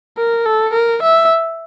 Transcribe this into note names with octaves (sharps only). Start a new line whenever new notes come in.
A#4
A4
A#4
E5